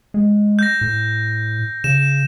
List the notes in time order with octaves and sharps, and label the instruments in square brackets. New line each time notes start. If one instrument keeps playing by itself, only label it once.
[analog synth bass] G#3
[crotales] G6 A#6
[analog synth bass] A2
[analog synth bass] C#3 [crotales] E7